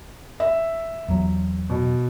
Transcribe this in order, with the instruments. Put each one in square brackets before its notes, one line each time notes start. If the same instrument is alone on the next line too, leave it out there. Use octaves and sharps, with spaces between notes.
[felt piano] E5
[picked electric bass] E2 F#3
[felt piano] B2